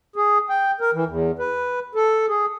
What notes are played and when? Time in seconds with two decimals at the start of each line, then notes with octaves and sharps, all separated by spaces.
0.16 G#4
0.50 G5
0.81 A#4
0.94 E3
1.07 E2
1.39 B4
1.95 A4
2.28 G#4